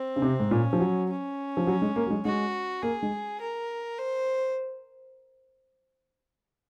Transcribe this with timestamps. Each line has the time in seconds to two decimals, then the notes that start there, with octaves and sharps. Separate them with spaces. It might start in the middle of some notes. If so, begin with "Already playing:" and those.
Already playing: C4
0.16 C#3
0.22 C3
0.40 G#2
0.51 A#2 C#4
0.73 F3
0.80 F#3
1.09 C#4
1.57 F3
1.67 F#3
1.82 G#3
1.96 A#3
2.06 F#3
2.10 G#3
2.25 G#3 F#4
2.83 A#3 G#4
3.03 G#3
3.41 A#4
3.99 C5